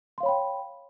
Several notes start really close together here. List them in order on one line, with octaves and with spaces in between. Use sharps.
C6 F5 C#5 B5 G5